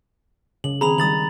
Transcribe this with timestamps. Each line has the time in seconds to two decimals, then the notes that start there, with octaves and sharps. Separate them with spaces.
0.64 C#3 F#7
0.81 D#3 C4 G#4 A#5 B5 F7
0.98 D#3 G3 D#6 A6 F#7